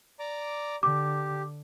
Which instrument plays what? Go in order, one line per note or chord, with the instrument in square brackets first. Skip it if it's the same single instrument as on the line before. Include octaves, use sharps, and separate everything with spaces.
[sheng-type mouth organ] D5 A#5 D6
[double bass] D3 [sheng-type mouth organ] G4 [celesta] D6